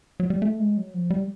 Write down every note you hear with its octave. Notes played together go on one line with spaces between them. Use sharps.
F#3
G3
A3
G#3
F#3
F3
G3